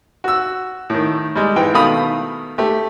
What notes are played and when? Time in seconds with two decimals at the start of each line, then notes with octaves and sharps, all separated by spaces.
0.24 F#4 E6
0.90 A2 D#3
1.35 G3 G#3
1.56 G#2 E3 G5
1.73 B2 D#3 A3 F5 B5 D#6
2.58 A3 G4